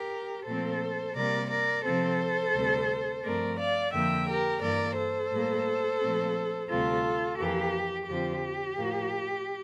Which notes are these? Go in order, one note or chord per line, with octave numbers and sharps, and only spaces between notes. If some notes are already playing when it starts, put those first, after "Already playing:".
Already playing: G4 A#4
A#2 F3 A3 C4 A4 C5
C3 G3 A#3 A#4 D5
A#4 D5
C3 F3 C4 A4 C5
D2 C3 G3 C4
G2 F3 A3 C4 A#4 D5
D5 F5
F2 D3 F3 A#3 E5 G5
G4 A#4
G2 E3 A#3 A#4 D5
A4 C5
A2 G3 A#3
A#2 F3 A3 C4
D2 C3 G3 C4 F4 A4
F2 E3 A#3 G4
F2 D3 F3 C4 G4
A2 F3 A#3